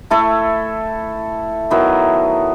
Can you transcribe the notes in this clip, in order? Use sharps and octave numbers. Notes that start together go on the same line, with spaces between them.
A3 E4 A4 E5
D#3 F#3 B3 E4